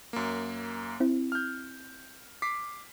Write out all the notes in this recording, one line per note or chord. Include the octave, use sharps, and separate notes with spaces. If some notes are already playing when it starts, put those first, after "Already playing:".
F#2 A#3
C4 E4
F6 G6
D6 B6 C7